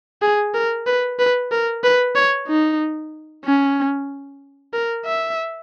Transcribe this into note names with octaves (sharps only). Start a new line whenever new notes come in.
G#4
A#4
B4
B4
A#4
B4
C#5
D#4
C#4
A#4
E5